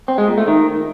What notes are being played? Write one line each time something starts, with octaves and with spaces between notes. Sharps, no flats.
C4
G#3
A#2
A3
D#3